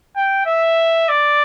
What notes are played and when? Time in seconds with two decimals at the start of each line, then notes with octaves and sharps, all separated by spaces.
0.16 G5
0.46 E5
1.09 D5